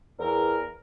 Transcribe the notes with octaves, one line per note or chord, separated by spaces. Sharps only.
E2 A#4